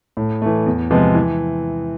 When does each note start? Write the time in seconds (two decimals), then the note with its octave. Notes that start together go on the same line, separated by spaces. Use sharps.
0.17 A2
0.42 E3 A3
0.66 E2
0.91 C3 F3 G#3 B3
1.15 E3